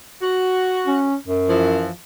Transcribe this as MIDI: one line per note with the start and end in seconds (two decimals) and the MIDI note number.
0.22 1.06 66
0.87 1.16 61
1.27 1.88 42
1.49 1.91 52
1.49 1.91 53